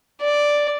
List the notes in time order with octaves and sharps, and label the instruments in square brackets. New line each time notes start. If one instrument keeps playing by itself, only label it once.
[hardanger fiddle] D5